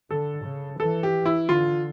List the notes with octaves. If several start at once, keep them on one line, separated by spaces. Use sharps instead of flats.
D3 A4
C#3
E3 A4
G4
E4
D3 F4